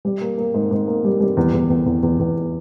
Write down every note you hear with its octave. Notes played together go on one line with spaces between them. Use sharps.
G3
A#3
A#3
G#2
G#2
A#3
G3
G3
E2
E2
E2
E2
E2
E2